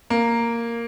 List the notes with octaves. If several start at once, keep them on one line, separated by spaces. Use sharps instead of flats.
A#3